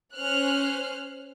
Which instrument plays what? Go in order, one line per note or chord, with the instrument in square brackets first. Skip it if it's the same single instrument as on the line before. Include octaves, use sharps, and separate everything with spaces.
[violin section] C#4 C5 F6 F#6